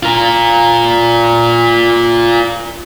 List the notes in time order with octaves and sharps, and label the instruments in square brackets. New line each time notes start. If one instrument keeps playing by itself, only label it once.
[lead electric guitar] F4 A#4